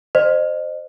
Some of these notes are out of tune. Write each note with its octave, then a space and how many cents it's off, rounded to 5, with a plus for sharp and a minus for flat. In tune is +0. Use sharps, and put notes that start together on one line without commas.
C5 +0 D#5 -35